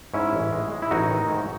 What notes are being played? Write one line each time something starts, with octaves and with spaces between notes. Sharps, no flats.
G#2 C#4 E4
A1
G#3
G#3
E4
A1 D#4 F#4
D#3
G#2